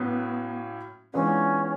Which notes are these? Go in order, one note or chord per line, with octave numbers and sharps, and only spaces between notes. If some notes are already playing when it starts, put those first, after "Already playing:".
Already playing: A2 F#3 A#3 B3 C#4
E3 G#3 B3 C#4 D4 F4